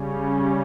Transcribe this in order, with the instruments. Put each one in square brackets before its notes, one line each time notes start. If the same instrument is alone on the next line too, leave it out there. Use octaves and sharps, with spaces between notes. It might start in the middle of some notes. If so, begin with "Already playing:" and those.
Already playing: [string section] C#3 G3 C#4